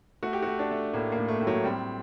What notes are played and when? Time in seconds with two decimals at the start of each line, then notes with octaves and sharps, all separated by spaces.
0.23 A3 F#4
0.33 G4
0.43 F#4
0.47 A3
0.59 D4
0.71 A3
0.93 A2 A#3
1.12 A#3
1.18 A2
1.28 A3
1.40 A2
1.47 F#3
1.64 G3 C4